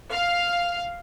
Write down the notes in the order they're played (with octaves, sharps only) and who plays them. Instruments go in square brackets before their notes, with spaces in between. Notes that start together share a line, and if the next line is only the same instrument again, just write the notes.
[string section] F5